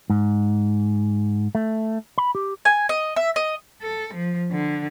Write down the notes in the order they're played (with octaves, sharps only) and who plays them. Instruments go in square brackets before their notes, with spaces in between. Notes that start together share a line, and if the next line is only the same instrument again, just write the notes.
[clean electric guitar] G#2
A3
B5
G4
[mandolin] G#5
D#5
E5
D#5
[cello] A4
F3
D3